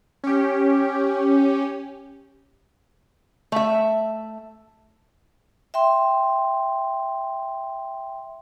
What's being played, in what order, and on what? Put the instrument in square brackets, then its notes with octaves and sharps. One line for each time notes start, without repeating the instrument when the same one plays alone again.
[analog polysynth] C#4 G4
[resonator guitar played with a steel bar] A3 E5
[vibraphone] E5 G5 C6